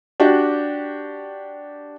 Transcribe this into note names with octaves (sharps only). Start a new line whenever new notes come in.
D4 F#4 G4 D5